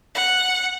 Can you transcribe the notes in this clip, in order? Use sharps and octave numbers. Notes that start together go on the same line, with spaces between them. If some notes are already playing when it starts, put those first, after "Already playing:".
F#5